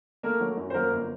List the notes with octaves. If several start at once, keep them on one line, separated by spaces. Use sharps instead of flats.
A3 A#3 A#4
F#3
F#2
C5
F#3 A#3 A#4
G1